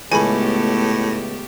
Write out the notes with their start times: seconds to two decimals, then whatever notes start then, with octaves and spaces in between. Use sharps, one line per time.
0.12 C#2 A2 A3 B3 G4 G#5 B5